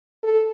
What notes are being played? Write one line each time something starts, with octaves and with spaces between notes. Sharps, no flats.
A4